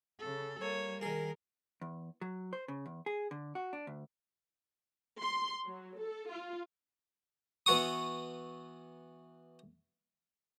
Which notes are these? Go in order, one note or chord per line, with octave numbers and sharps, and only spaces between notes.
C#3 A4
G3 A#3 C#5
D#3 G#4 A#4
E2
F#3
C5
C#3
E2
G#4
D3
F#4
D4
D2
C6
F#3
A4
F4
E3 B3 F#4 C#6 D#6